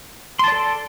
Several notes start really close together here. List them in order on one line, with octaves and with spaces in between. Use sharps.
C6 A5 D5 A4